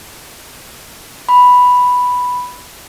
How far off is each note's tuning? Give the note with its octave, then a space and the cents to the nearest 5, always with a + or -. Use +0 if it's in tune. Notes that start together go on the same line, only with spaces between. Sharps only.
B5 +0